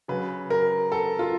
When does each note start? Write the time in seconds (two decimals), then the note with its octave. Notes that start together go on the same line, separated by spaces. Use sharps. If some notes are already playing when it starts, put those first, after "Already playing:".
0.08 C#3 F#3 B4
0.50 A#4
0.92 A4
1.19 F4